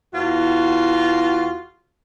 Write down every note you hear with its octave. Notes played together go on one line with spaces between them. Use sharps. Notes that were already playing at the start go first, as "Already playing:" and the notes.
E2 F4 F#4